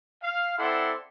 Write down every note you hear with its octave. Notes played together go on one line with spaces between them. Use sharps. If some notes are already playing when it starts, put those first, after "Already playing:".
F5
C4 E4 A4 D5 F#5 C6